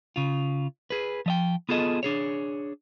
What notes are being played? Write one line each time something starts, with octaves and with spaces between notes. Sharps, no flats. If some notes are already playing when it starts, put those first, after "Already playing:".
C#3 F4
G#4 B4
F3 D#5 G5
B3 F4 G#4 A4 D#5
D4 G#4 C#5